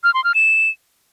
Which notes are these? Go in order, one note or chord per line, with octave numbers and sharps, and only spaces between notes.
F6
C6
F6
E7